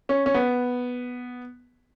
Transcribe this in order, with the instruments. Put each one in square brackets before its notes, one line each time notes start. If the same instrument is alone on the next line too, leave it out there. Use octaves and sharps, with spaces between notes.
[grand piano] C#4
C#4
B3